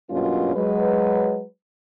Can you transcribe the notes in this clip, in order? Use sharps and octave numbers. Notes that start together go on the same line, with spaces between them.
G2 B2 F#3 A#3 C#4 F4
F#3 G#3 B4